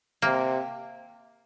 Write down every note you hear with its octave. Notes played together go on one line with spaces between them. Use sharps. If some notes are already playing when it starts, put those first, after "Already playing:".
C3 A#3